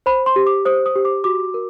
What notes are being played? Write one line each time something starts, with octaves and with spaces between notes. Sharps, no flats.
C5 B5
C6
G4
D6
C5 D#6
D#6
G4
D6
F#4 D6
A#4